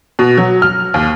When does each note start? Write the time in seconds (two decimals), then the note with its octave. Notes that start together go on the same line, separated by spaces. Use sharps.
0.19 B2
0.38 F#3
0.62 F6
0.94 D#2